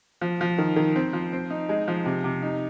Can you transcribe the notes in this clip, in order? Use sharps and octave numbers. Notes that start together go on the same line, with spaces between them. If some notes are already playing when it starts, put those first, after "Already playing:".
F3
F3
D#3
D#3
C4
F3
C4
D#4
G#3
F3
C3
C3
D#4